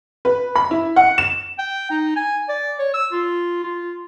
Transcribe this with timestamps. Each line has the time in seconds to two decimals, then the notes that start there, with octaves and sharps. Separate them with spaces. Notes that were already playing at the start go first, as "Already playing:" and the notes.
0.25 B4
0.55 B5
0.71 E4
0.96 F#5
1.18 E7
1.59 G5
1.91 D#4
2.16 G#5
2.49 D5
2.79 C#5
2.94 E6
3.12 F4
3.64 F4